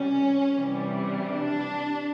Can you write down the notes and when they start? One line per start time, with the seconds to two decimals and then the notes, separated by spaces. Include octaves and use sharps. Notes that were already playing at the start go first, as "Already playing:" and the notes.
Already playing: C3 E3 G3 C#4
0.54 C3 E3 G3
1.28 D4